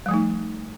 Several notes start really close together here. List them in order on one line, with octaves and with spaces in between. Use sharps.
G3 F3 A3 D#4